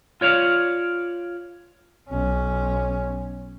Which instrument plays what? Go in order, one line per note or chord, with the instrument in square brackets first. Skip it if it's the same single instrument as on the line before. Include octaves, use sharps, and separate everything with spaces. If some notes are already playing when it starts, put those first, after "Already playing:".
[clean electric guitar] F4 C#5 D5 F5
[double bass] B1 C#4